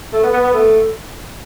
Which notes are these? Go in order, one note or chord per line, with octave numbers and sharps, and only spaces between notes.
A3
B3
B3
B3
A3